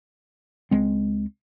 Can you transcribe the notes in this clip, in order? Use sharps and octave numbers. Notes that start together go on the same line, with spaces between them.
C#2 G#3 C4